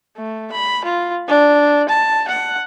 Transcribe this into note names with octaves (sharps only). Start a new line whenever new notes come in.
A3
B5
F4
D4
A5
F#5